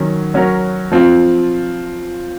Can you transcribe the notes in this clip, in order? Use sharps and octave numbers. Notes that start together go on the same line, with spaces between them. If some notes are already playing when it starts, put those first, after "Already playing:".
Already playing: D#3 F#3 C#4
F#3 C#4 F#4 A#4
F3 C4 F4